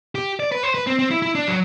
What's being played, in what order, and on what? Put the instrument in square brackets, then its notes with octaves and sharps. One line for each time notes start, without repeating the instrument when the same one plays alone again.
[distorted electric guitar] G4
D5
B4
C5
B4
C4
C4
E4
E4
D4
F#3